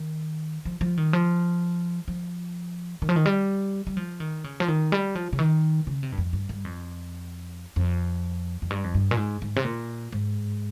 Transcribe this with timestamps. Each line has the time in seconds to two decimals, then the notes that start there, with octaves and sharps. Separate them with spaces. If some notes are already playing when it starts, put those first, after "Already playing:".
Already playing: D#3
0.65 F3
0.81 F3
0.97 D#3
1.13 F3
2.08 F3
3.02 D#3
3.09 F3
3.16 D#3
3.26 G3
3.87 G3
3.97 F3
4.20 D#3
4.44 C#3
4.60 F3
4.68 D#3
4.92 G3
5.15 F3
5.33 C#3
5.39 D#3
5.87 C#3
6.03 C3
6.12 G2
6.18 F2
6.33 G2
6.49 G2
6.65 F2
7.76 F2
8.62 F2
8.70 G2
8.84 F2
8.95 G2
9.11 A#2
9.17 G#2
9.42 G#2
9.56 C3
9.64 A#2
10.12 G#2